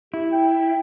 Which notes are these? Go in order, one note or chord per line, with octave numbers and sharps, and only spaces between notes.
E4 G4
G5